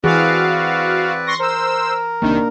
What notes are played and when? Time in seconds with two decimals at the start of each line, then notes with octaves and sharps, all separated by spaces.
0.04 E3 C4 F#4 G#4 B4 D5 F5
1.27 C6 C#6 A#6
1.39 A#4 C5 E6
2.22 C2 D#3 A#3 D4